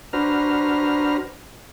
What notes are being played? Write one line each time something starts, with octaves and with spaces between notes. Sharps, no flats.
D4 F#4 B4 C5 A#5 F6